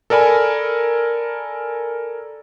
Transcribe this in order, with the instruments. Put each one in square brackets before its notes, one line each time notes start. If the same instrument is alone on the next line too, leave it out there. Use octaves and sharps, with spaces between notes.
[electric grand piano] A4 A#4 D5 G#5 B5